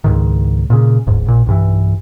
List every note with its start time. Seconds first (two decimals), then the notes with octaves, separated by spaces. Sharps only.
0.04 C#2 G#2 D#3
0.70 A#2 C#3
1.07 D1 G1 G#2
1.26 A#1 A#2
1.46 B1 G2 E3